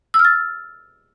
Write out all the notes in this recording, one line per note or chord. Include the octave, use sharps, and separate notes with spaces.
E6
F6
A6